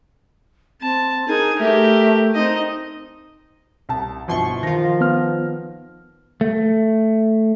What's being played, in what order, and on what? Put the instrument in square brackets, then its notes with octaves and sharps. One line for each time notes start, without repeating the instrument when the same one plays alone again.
[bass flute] C4 [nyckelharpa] A5
[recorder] D#4 [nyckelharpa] G#4 G#5 [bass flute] A#4
[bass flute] A3 [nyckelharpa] G4 A#4 [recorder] E5
[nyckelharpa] C4 D#5 [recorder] D#4
[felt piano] C2 A5
[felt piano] G1 B2 F3 [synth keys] E3 C6 C#6
[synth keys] D#3 F4 [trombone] F3 [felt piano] A#6
[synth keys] D#3 [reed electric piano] B3 F6
[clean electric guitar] A3